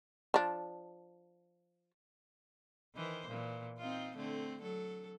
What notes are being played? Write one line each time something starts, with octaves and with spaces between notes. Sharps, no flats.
F3 D4
D#3 E3 C5
A#2 E3
C4 D#4 F4
D3 A3 C4
F#3 A4